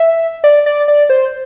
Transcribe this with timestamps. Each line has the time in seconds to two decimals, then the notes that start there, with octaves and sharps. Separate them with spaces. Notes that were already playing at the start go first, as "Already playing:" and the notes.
Already playing: E5
0.44 D5
0.66 D5
0.88 D5
1.10 C5